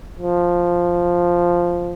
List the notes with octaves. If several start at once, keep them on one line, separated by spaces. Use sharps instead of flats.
F3